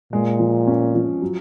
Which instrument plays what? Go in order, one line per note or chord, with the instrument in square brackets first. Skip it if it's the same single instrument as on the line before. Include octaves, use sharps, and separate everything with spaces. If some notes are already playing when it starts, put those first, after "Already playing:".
[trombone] A#2 [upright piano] G#3
[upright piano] F3
C#4
F3
F#3